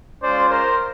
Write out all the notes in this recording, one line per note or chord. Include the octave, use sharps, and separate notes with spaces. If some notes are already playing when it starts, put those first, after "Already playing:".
G#3 C#4 F4 C5 D5
A#4 C5